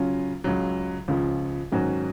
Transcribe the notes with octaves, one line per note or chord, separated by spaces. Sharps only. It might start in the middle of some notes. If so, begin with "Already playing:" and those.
Already playing: C#3 F#3 C#4 F4
C#2 C#3 F#3
C#2 C#3 F3
G#2 D#3 F#3 C#4 F#4